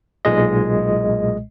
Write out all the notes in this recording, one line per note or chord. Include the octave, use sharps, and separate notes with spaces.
B1 A#2 G#3 D#5